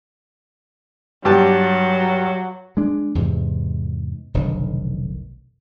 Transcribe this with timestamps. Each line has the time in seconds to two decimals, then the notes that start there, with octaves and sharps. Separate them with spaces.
1.25 G2 F#3 G4 A5
2.77 G#3 D4
3.15 E2 G#2 C3
4.34 F1 B1 D3 D#3